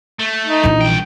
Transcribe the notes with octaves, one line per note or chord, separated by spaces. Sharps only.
A3
D#4
A#1 E3
C2 G5